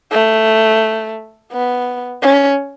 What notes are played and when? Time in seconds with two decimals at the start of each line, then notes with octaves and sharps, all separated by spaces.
0.12 A3
1.52 B3
2.22 C#4